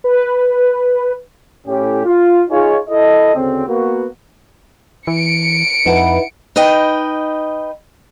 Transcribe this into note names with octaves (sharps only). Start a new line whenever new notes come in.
B4
A2 C#4 G4
F4
D#4 F4 G#4 C#5
E4 A4 D#5
D2 C#3 C4
A#3 B3 F#4
E3 C#7 D7
F2 D#4 E4 B4 F#5 A5
D#4 B4 D#5 G5